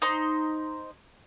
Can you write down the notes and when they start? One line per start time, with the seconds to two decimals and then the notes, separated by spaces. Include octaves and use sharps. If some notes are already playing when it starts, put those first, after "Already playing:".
0.02 D#4 C5 C6